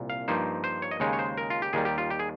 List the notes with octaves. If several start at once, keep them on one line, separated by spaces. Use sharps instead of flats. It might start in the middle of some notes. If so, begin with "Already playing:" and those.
Already playing: C2 A#2
F5
G2 F3 A#3 D#4 C5
C5
C#5
D#5
D#2 C#3 G#3 D#4 C#5
C#5
C5
A#4
F4
G4
D#2 D#3 G3 G#4
G4
F4
G4
G#4